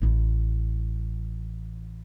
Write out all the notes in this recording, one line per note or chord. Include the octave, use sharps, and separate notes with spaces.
A1 E4